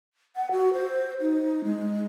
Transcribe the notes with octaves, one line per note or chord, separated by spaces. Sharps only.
F#5
F#4
C5
D#4
G#3